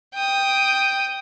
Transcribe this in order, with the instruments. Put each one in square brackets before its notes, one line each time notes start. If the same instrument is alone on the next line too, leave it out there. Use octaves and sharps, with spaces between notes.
[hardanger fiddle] G5 D#6